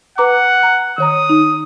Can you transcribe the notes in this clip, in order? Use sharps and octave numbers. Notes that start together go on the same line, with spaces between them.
B4 F#5 A#5 D6
A#5
D#3 C#5 A#5 D#6
D#4